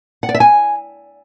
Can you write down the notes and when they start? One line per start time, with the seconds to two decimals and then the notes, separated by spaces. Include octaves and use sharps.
0.23 F#5
0.29 D5
0.35 E5
0.40 G#5